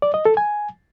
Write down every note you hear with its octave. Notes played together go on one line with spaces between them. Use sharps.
D5
D#5
A4
G#5